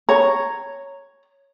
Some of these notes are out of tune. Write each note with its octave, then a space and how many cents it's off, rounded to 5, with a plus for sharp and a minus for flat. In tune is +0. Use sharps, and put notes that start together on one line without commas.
C#5 +0 A#5 -10